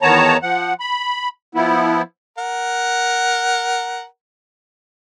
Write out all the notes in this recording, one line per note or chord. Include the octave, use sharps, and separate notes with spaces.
E2 D#3 B3 C#5 A5 A#5
F3 F#5
B5
F3 B3 E4
A#4 F#5